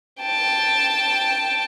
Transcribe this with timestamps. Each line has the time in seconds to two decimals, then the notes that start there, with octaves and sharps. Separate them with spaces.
0.21 G5 A5